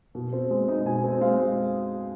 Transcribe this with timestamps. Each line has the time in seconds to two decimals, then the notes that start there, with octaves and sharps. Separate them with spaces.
0.15 B2
0.33 C4
0.50 G#3
0.68 D#4
0.86 B2 G#5
1.04 C4
1.21 G#3 F5